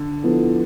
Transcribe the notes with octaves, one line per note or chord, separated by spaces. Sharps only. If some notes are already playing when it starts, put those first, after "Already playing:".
Already playing: D3
F3 B3 E4 A4